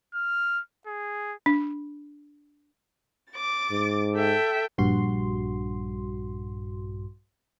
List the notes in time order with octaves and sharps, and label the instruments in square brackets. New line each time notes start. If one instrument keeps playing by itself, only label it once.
[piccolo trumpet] F6
G#4
[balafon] D4
[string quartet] D6 A6
[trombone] G#2
[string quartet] A4 E5 G5
[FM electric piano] A#1 G2 F#4 C6